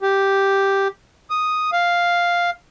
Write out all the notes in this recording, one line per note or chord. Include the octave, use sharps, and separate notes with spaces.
G4
D#6
F5